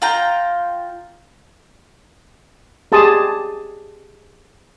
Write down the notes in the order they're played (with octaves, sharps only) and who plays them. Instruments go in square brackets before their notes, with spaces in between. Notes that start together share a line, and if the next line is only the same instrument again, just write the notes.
[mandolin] F4 G5 A#5
[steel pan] G4 G#4 A5 C6 D#6